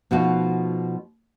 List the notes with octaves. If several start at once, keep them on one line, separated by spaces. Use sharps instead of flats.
B2 F3 A3 D#4 F4 F#4